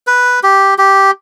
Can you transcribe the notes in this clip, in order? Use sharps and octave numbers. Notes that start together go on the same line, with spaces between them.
B4
G4
G4